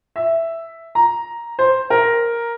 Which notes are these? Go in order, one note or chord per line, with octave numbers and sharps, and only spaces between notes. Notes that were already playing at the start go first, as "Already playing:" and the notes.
E5
A#5
C5
A#4